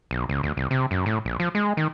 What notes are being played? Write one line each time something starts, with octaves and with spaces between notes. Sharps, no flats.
B1
C#2
D2
C2
C3
F#2
A2
A#1
F3
G#3
D#3